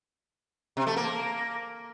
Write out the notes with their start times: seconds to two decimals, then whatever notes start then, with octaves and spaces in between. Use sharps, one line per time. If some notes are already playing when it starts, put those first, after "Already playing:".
0.77 C3
0.87 A3
0.97 A#3